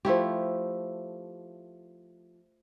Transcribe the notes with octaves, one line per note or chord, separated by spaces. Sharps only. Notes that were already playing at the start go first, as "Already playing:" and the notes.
F3 A3 E4 G4